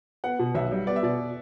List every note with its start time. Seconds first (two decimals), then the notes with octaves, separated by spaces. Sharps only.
0.24 B3 F#5
0.39 B2
0.55 B1 E5
0.71 G3
0.87 B3 D5
0.96 E5
1.03 B2 D5